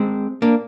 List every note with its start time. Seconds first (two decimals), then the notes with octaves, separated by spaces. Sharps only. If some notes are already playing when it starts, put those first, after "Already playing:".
Already playing: G#3 C4
0.42 A#3 D4